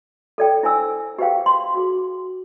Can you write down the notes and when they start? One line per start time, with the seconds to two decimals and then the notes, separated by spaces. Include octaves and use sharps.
0.38 A4 D5 G5
0.63 E4 C5 G#5 E6
1.19 G4 G#4 B4 C5 F5 G5
1.46 C6
1.74 F#4 G#4